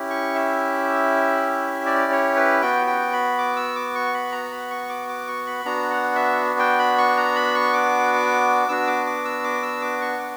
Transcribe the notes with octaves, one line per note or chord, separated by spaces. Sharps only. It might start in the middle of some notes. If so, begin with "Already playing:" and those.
Already playing: C#4 E4 G4
C#6
E5
D5
C#5
B4
B3 F#4 G5
G5
B5
D6
E6
D6
C#6
B5
A#5
B5
C#6
D6
D6
C#6
B5
B3 D4 F#4 A#5
F#5
E5
G5
B5
C#6
A#5
B5
C#6
D6
B3 D4 F#4 E6
D6
D6
E6
D6
E6
D6
C#6
D6